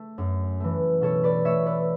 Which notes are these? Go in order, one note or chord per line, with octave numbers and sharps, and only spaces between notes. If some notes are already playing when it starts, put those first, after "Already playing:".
Already playing: A3
F#2
E3 A3
B2 A4 C#5
B4 D5
A3 C#5 E5
B4 D5